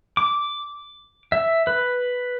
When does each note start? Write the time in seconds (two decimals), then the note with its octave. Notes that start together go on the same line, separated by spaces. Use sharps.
0.17 D6
1.32 E5
1.67 B4